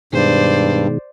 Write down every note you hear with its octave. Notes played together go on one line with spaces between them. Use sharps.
G2 B2 D#3 G#3 C5 D5